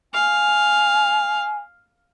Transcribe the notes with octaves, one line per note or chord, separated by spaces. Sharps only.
F5 G#5